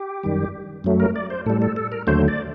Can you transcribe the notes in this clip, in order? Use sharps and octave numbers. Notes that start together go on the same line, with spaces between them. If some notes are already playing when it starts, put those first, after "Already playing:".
Already playing: G4
F#2 D#3 G3
F#2 F#3 A3
A#4
D5
C5
A2 G3 A4
A4
A4
A#4
D#2 D3 F#3 A3 C5
D5